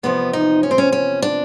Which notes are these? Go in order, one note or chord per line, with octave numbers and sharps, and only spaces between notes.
E2 C3 F3 B3
D#4
C#4
C4
C#4
C#4
D4